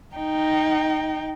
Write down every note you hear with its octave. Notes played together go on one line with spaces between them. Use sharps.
D#4 G5